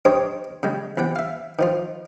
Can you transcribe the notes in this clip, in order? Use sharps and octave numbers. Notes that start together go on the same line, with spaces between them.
D4 G4 A#4 C5 C#5 D#5
C#3 G3 G#3
E2 C3 F#5 G5
E5 F5
D#3 F3 F4